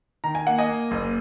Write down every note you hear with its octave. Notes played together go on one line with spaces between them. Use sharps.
D#3 A#5
G#5
A#3 F#5
D#5 G#5
A#3
F#1